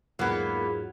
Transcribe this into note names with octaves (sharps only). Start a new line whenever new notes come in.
E2 G#2 F#3 A#3 B3 F4 G#4